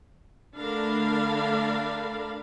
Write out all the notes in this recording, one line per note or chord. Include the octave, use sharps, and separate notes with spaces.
D3 A3 D4 A#4 F5 B5